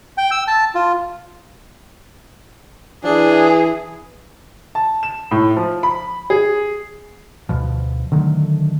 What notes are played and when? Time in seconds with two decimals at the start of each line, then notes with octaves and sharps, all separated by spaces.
0.18 G5
0.31 E6
0.47 A5
0.75 F4
3.04 E3 D4 G#4
4.75 A5
5.03 E7
5.31 A2
5.57 F3
5.83 B5
6.30 G#4
7.49 D2 B2 F3
8.12 D3 D#3 F#3 A3